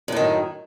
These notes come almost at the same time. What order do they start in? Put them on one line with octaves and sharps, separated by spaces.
F#2 A2 D#3